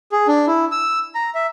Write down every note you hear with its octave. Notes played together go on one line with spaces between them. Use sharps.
G#4
D4
E4
E6
A#5
E5